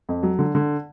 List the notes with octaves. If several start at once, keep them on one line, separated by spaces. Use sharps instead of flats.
F2
F#3
D3
D3